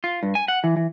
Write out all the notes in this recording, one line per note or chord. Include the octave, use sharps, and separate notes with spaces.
F4
G2
G#5
F#5
E3
E3